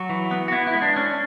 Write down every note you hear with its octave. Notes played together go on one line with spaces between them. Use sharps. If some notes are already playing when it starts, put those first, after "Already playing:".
Already playing: F#3 F#4
E3
B3
F#4
B3 E4
E4
G#3
D4
C#4